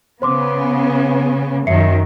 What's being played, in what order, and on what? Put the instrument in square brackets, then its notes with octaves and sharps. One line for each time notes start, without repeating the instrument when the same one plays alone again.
[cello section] C#3 B3 [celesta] C5 C6 D6
[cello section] F#2 D#3 F#3 [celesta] E5 C7 C#7